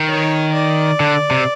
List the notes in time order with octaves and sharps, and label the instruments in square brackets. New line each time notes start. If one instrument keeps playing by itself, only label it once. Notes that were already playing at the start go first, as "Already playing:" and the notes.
Already playing: [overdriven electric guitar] D#3
[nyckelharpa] C#5
D5
[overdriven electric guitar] D3
C3